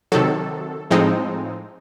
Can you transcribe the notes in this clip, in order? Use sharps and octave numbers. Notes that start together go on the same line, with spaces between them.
C3 D#3 F#3 A4
A2 F3 G#3 C4 D#4